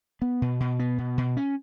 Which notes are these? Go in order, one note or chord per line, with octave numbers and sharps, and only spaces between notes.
B3
B2
B2
B3
B2
B2
C#4